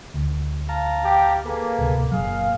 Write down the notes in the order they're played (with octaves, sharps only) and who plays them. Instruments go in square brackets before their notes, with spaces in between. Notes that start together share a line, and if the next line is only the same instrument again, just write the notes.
[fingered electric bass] D2
[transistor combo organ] F5 A5 A#5
[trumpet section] G4
[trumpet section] A#3 [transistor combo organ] G#4 A4 B4
[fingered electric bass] D1 C3
[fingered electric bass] F#1 D#2 F#3 [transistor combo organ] A#2 [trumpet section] G#4 F5